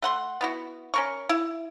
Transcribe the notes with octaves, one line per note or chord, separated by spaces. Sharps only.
A3 F#5 C6
B3 E4 F#4
C#4 A#4 C#6
E4